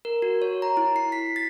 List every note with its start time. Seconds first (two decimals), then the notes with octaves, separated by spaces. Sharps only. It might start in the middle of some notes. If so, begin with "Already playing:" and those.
0.05 A#4
0.22 F#4
0.42 C#5
0.62 A#5
0.77 E4
0.96 C7
1.12 B6
1.36 A6